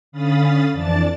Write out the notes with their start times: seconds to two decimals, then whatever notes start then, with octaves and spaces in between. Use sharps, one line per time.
0.12 D3 C#4 F5 B5 D#6 A6
0.72 F2 E3 D4 D5 A5 A6